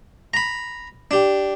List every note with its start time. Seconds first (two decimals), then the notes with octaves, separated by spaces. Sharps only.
0.34 A#5 B5
1.11 D4 G4